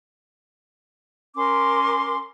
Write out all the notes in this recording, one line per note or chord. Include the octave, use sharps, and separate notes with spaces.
C#4 A#4 C6 D6